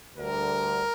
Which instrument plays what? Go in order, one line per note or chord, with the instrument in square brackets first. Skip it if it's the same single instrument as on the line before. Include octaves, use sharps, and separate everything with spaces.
[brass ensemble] D2 D3 G3 A#4